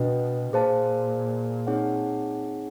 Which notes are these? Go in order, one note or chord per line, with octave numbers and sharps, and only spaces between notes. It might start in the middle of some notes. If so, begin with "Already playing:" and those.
Already playing: B2 D4 F#4 B4 D#5 G5
A#2 G#4 C5 F5 A5
C4 D#4 G#4 C#5 F#5